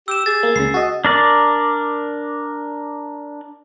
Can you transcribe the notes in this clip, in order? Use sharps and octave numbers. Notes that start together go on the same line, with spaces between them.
G4 E6 E7
G#4 A6
A#3
C#2 C#3 C7
F#4 D#5
D4 A#4 D5